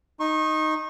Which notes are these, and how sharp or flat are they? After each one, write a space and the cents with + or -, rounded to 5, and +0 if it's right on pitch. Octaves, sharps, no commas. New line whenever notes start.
D#4 +0 C#6 -35